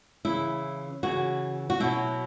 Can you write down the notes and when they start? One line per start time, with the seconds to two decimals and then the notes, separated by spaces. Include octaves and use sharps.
0.25 C#3 E3 E4
1.03 C#3 E3 F#4
1.70 F#4
1.80 B2 F#3 E4